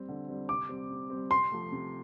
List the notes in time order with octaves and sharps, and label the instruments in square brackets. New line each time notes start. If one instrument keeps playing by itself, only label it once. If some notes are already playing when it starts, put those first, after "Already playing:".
Already playing: [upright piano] G3 C4
D3
G3 C4
[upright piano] C3 [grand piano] D6
[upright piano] G3 C4
C3
C4
G3
[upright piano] C3 [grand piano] C6
[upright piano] F3 A3
C3